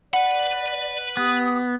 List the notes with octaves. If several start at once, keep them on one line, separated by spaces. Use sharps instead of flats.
B4 D5 F#5 B5
B3 G4 D#6